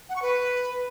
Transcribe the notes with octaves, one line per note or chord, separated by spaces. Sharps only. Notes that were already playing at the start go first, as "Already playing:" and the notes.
F#5
C#6
B4